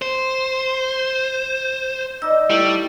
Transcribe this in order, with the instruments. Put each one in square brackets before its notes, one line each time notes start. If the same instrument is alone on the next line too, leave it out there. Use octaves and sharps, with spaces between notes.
[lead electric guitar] C5
[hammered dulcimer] D#4 D5 [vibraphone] E6
[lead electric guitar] G3 [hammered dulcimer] A3 C#5 [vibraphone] E4